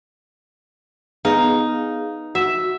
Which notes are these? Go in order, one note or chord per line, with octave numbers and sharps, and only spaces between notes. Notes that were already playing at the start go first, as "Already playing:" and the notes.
B3 D#4 G#4 F5
F#4 E5